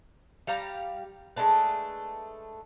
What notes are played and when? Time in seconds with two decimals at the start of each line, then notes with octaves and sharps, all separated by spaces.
0.47 G3 G4 F5 A#5
1.36 G#3 A3 D4 B4